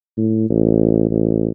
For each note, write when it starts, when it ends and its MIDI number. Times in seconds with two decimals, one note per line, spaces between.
0.17 0.47 45
0.50 1.08 33
1.10 1.50 33